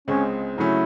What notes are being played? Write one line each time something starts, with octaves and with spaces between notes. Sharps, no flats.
C#2 C#3 G#3 C4 C#4
C#3 F#3 A3 C#4 E4